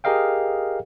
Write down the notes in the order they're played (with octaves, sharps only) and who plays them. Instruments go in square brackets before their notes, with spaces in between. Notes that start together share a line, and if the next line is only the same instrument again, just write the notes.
[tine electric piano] G4 G#4 A#4 D#5 F5 G5